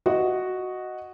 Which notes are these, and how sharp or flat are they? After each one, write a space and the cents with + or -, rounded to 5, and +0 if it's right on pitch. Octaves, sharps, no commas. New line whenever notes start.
F#4 +0 D#5 +0